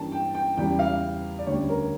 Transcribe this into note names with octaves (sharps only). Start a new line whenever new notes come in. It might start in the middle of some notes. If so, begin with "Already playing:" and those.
Already playing: G2 E3 G3 A#3 C#4 A5
G5
G5
E2 C#3 G3 G5
F5
D5
D2 C#3 G3 C#5
A#4